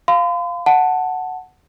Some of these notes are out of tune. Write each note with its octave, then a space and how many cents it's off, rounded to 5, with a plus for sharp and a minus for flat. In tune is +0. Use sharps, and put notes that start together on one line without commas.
F5 +0 C6 -45
F#5 +0 A5 +5